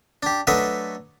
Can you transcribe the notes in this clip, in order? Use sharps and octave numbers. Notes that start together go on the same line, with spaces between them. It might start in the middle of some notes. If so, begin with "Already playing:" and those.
D4 G4
F#3 A3 D4 A4 B4 D#5